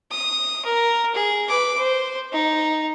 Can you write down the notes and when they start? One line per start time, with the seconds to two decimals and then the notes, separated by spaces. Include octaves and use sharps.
0.11 D#6
0.65 A#4
1.15 G#4
1.48 B4 D6
1.78 C5
2.32 D#4